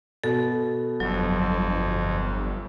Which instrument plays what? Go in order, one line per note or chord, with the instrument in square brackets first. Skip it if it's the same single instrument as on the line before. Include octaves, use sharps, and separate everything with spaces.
[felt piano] B2 [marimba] A4
[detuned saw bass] G1 [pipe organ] F2 [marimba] F#3